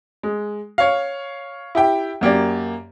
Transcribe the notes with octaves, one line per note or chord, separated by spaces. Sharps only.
G#3
C#5 F5
E4 G4 G5
F#2 A#3 G4 D5